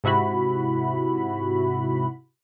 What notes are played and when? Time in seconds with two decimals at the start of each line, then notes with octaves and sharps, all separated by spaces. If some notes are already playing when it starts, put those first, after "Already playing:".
0.04 G#2 C3 E4 F#4 B5